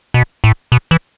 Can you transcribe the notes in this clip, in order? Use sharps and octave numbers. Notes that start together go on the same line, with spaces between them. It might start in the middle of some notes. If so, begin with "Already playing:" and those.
B2
A2
B2
E3